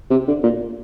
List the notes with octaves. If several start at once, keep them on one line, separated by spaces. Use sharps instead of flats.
C3
D3
A#2